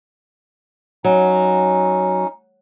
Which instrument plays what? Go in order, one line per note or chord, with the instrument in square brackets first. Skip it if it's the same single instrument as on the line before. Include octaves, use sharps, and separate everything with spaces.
[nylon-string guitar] F#3 [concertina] C#4 D#4